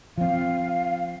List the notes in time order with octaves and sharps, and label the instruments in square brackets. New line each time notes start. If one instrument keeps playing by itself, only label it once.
[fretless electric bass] F3 C4 [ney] F5